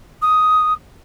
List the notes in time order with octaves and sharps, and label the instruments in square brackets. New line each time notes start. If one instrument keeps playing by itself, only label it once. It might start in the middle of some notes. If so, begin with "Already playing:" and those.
[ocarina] D#6